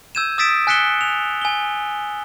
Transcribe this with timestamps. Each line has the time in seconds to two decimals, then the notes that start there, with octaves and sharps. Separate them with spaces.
0.15 E6 G6 G#6 D#7 E7
0.38 D#6 E6 A6 B6 D7 E7
0.67 G#5 F#6 B6 C#7 E7 G7
1.01 F7
1.41 G#5 G7